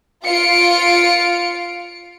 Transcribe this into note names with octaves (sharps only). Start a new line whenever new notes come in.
F4 F5 C#7 D7